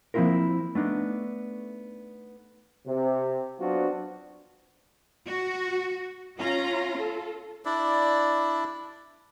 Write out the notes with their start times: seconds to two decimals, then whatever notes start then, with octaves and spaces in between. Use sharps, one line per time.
0.14 F3 A#3 C4 E4 F4 A#4
0.75 A3 B3 D4 D#4
2.87 C3
3.60 F#3 B3 C4 D4 F4 F#4
5.26 F#4
6.38 C#4 F4 A#5
6.98 A4
7.65 D4 E4 D5